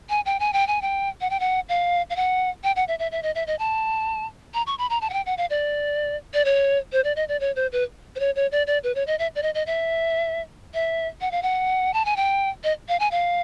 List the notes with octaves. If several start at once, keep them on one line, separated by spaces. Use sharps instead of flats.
G#5
G5
G#5
G5
G#5
G5
F#5
G5
F#5
F5
F5
F#5
G5
F#5
E5
E5
E5
D#5
E5
D#5
A5
A#5
C#6
B5
A#5
A5
F#5
G5
F#5
F5
D5
D5
C#5
C5
D5
D#5
D5
C#5
C5
B4
C5
C#5
C#5
D5
D5
B4
C#5
D#5
E5
D5
D#5
D#5
E5
E5
F#5
F5
F#5
A5
G#5
G5
D#5
F5
G#5
F5